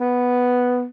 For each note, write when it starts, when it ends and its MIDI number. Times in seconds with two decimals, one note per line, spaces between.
0.01 0.84 59